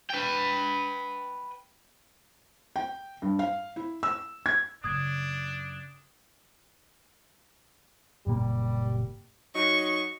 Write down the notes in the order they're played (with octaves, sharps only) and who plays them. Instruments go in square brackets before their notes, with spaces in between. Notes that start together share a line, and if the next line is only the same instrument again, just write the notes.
[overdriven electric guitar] B4 G5
[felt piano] G5
G2
F5
E4
E6
G#6
[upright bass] F#2 C#3 [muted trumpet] D4 [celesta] D#6 G#6
[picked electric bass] F#1 A#2 A#3 [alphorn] G3
[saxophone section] F#3 D#4 [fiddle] C#6